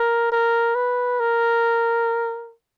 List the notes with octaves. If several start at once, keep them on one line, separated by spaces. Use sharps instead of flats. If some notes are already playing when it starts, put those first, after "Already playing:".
Already playing: A#4
A#4
B4
A#4